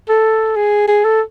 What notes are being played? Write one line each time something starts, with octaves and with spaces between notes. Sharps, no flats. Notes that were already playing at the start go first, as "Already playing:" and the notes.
A4
G#4
G#4
A4